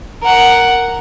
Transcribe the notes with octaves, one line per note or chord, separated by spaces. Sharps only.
A#4 F#5